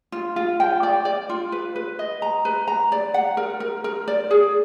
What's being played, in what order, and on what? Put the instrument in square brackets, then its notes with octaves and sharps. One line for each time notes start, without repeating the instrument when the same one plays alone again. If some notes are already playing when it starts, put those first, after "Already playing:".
[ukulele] F4
F4
G5
D5
D5
F4
B4
B4
D#5
A#5
B4
A#5
D5
F#5
A#4
A#4
A#4
D5
G#4